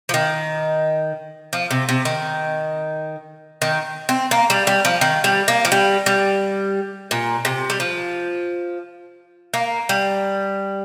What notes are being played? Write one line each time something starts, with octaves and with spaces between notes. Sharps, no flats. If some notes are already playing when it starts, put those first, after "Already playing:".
F3
D#3
F3
C3
C3
D#3
D#3
C4
A#3
G3
G3
F3
D#3
G3
A#3
F3
G3
G3
A#2
C3
G3
F3
A#3
G3